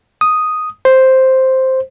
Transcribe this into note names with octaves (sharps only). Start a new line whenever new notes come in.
D#6
C5